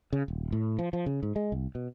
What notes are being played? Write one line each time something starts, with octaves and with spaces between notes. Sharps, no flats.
C#3
D#1
A2
F3
F3
C#3
G#2
G#3
C2
B2